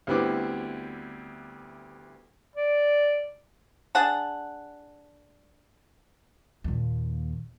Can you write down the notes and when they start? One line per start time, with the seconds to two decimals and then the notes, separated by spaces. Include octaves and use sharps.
0.07 D2 G3 B3 C4 E4 D6
2.56 D5
3.95 D4 G#4 F#5 A5
6.64 D#2 A#2